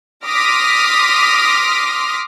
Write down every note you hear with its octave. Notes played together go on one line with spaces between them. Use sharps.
C6 D6 D#6 F6 A#6 B6